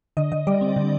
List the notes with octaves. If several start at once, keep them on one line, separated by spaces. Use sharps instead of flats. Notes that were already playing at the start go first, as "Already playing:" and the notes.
D3 D#5
D3 D#5
G3 D5
C4
D3